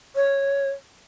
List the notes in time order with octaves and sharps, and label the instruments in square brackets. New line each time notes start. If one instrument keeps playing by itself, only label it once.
[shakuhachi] C#5